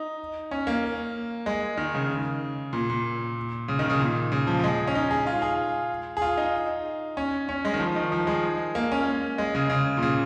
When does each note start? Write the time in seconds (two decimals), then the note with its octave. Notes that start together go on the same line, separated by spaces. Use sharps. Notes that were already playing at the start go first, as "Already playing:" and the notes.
Already playing: D#4
0.51 C#4
0.67 A#3
1.46 G#3
1.77 D#3
1.95 C#3
2.73 A#2
2.90 A#2
3.68 C#3
3.79 D#3
3.90 C#3
4.00 A#2
4.32 C#3
4.47 F3
4.59 F3
4.64 G#3
4.87 C#4
4.95 D#4
5.11 G#4
5.27 F4
5.42 G#4
6.17 G#4
6.22 F4
6.37 D#4
7.17 C#4
7.49 C#4
7.65 G#3
7.74 D#3
7.79 F3
7.96 D#3
8.12 F3
8.27 G#3
8.75 A#3
8.92 C#4
9.38 G#3
9.55 C#3
9.70 C#3
9.97 A#2
10.02 C#3